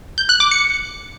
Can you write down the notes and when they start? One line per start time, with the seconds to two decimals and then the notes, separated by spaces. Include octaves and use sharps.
0.18 G6
0.29 F#6
0.40 D6
0.51 C#7